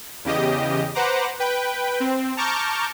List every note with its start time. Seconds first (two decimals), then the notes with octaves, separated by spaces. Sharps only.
0.25 E2 C#3 G4 D#5
0.94 B4 C5 F#5 A#5 D6
1.39 B4 G5
2.00 C4
2.37 A5 A#5 C#6 D6 F6 G6